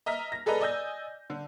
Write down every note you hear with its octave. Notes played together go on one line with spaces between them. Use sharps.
D#5 E5 A#5 F6 B6
A#6
G#4 A4 B4 D5 D#5 A#5
D5 D#5 G#5 E6 G6 A#6
D3